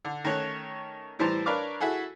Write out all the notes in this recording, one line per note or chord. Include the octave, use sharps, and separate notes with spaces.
D3
D#3 A3 C#4 C#5 C#6 F#6
A2 E3 G3 C5 A5 A#5
D4 A#4 B4 C#5 F5 D6
E4 F#4 G#4 A4